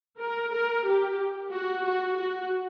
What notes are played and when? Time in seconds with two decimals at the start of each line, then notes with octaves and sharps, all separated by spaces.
0.19 A#4
0.52 A#4
0.86 G4
1.51 F#4
1.85 F#4
2.17 F#4